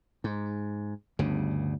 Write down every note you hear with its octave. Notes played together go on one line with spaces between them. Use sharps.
G#2
G1 D2 G2 C#3